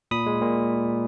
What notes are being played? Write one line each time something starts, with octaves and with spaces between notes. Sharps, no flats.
A#2 B5 D#6
G#3
A#2